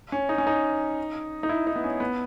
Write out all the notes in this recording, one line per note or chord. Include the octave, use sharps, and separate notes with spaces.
C#4
D#4
C#4
D#4
D#4
E4
D#4
B3
C#4
B3